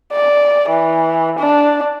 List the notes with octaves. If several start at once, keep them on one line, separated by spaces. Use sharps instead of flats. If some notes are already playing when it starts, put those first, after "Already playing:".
D5
E3
D4